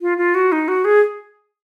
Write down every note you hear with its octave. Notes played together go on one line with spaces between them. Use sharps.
F4
F4
F#4
D#4
F#4
G#4